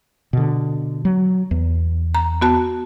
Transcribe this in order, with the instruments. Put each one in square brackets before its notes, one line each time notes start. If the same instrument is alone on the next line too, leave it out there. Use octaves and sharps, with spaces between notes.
[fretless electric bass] B2 D3
F#3
E2
[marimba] A#5
B3 F#4 A5